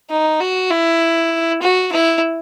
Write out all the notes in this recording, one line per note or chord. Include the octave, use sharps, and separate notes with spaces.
D#4
F#4
E4
F#4
E4